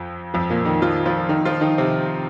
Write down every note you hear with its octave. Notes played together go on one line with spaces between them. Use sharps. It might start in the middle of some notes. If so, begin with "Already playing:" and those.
Already playing: F2 F3
F2 F3
A#2 A#3
D#3 D#4
F3 F4
F3 F4
D#3 D#4
F3 F4
D#3 D#4
C3 C4